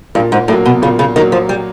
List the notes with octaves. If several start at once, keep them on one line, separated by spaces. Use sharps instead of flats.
G2 A#2
G#2
A2 F#3 A#3
B2
A#2 C#3
C#3
D#3 F#3 A#3
F3
G3